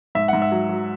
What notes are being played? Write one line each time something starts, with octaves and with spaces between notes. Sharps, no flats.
G#2 E5
G#2 F#5
E5
F#3
F#3